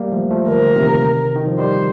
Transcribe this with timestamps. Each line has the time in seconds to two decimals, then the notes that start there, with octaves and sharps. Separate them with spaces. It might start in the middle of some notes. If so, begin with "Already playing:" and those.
Already playing: G3 A#3
0.12 F3 A3
0.31 F3 A3
0.48 D3 F3 A#4
0.76 C3 D#3
1.36 D#3
1.47 F3
1.58 D#3 G3 C5